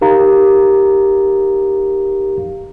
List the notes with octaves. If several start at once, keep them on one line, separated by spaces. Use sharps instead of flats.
D#4 G4 A#4 F5 A#5